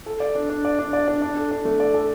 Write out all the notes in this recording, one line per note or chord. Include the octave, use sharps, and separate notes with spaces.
A4
D5
D4
D4
D5
D4
D5
D4
D4
A4
D4
A3
D5
A4